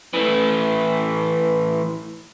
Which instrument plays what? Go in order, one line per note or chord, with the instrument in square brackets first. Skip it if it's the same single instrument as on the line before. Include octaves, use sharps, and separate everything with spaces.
[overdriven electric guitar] E3 A3